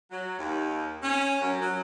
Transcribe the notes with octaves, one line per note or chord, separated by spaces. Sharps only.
F#3
D#2
C#4
F#2
F#3